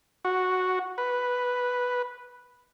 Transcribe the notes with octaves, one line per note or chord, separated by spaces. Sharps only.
F#4
B4